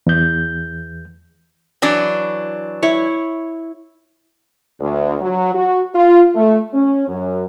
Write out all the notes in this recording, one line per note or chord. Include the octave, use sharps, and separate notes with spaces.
E2 G6
E3 F#3 D4
E4 C#5
D2
F#3
F#4
F4
A3
C#4
F#2